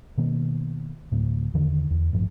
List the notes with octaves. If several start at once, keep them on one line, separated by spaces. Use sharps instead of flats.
B2 D#3 A#3
D2 A2
E2 D3 D#3
E2
A1 G2 F3